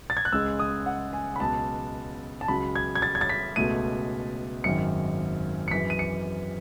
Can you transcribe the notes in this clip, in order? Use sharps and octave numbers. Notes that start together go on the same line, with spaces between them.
A6
G#6
F#6
C#2 C#3 G#3 E6
D#6
F#5
G#5
B5
C#2 B2 F#3 A5
A5
C#2 C#3 F#3 B5
G#6
G#6
A6
G#6
A6
B6
C#2 B2 A3 D#7
G#1 F#2 D#3 C#7
C#7
F#2 E3 G#3 B6
D#7
C#7